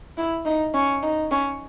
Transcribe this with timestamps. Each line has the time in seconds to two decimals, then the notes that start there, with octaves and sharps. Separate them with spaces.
0.18 E4
0.46 D#4
0.74 C#4
1.03 D#4
1.31 C#4